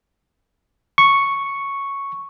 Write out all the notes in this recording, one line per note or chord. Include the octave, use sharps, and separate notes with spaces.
C#6